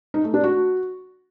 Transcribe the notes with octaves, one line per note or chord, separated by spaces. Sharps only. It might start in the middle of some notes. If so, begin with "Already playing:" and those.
D#4
A3
D4
F#4